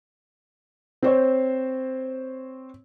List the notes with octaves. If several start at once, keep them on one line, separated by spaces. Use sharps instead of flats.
C4 C5 C#5